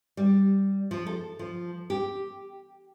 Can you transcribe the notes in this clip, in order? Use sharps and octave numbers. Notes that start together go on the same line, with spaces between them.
G3
F3
A4
F3
G4